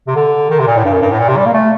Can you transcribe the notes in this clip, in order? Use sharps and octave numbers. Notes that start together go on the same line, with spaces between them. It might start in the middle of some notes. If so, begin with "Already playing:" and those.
C3
D3
D#3
C3
A#2
A2
G2
F#2
G2
A2
A#2
C3
G3
A#3
A3